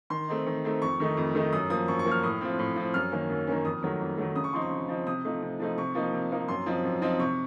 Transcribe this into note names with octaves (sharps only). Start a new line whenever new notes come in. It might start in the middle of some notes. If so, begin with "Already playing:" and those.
D#3 C6
A3 C4 D#4
D#3
A3 C4 D#4
F2 C#6
D#3 A3 D#4
F2
D#3 A3 D#4
F#2 D#6
F3 A#3 D#6
F#2 C#6
C#6
F3 A#3
F6
A2 D#6
F3 C4
A2
F3 C4
F#2 F6
D#3 A#3 C#4
F#2
D#3 A#3 C#4
F2 D#6
D#3 F#3 A3
F2
D#3 F#3 A3
C#3 D#6
C#6
F3 C4 D#4 C6
C#6
C#3
F3 C4 D#4
C3 D#6
F3 A3 D#4
C3
F3 A3 D#4
C3 C#6
F3 A#3 D#4
C3
F3 A#3 D#4
F#2 C6
F3 C4 D#4
F#2
F3 C4 D#4
C3 C#6